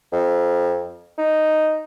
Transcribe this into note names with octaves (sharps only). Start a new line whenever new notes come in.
F2
D#4